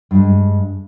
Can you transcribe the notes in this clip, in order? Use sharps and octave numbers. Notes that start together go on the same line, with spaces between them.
G2 G#3